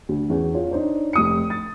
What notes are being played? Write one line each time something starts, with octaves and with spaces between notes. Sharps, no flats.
D2
E2 C#4
F4 C#5
D4 D#4 C5 C#5
F1 D#6 C#7
A6